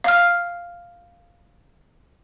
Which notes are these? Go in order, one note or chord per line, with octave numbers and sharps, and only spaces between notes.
F5 F6